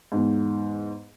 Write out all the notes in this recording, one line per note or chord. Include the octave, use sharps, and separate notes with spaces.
E2 G#2